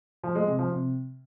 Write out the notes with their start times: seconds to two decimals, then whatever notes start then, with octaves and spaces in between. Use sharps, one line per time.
0.24 F3
0.35 G#3
0.47 C3
0.59 F3
0.71 C3